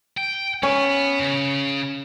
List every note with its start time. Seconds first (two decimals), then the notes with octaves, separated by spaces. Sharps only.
0.18 G5
0.63 B3 C#4
1.19 C#3